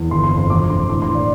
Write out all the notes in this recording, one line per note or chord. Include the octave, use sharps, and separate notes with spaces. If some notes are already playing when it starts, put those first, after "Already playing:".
Already playing: E2
G1 C6
C6
F2
C6
E1 D6
D3 C6
A2 D6
C6
E3
D5